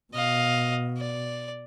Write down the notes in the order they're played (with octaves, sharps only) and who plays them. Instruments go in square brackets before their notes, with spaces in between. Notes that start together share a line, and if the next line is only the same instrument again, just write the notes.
[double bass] B2 [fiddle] D#5 F5
[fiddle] D5